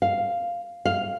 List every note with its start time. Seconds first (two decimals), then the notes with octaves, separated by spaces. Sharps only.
0.02 F5
0.85 F5